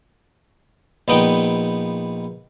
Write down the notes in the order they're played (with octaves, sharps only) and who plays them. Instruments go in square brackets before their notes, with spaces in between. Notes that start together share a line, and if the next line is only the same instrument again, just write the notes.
[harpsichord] A#1 B3 D#4 G5